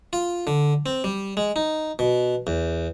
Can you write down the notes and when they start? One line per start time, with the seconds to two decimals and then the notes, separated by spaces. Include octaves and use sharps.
0.13 F4
0.47 D3
0.86 C4
1.04 G3
1.37 G#3
1.56 D#4
1.99 B2
2.47 E2